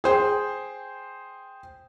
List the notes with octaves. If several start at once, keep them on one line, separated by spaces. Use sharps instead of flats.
G#4 C5 G5